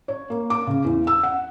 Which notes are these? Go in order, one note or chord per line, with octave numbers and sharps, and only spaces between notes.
C#5
A#3
D6
C#3
E2
E6
F#5